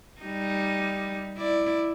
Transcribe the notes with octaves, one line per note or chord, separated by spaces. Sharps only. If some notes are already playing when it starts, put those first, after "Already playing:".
G3 D#4
E4 D5